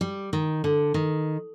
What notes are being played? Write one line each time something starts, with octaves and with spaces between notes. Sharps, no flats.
G3
D#3
D3
D#3